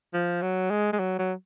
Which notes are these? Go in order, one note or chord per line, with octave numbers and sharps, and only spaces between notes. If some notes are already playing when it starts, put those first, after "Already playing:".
F3
F#3
G#3
G#3
F#3
F#3